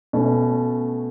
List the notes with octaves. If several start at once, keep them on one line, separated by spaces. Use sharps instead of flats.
B2 A3 C#4